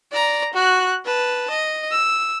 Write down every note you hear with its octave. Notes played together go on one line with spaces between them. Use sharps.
D5 A#5
F#4 F#6
B4 A5
D#5
E6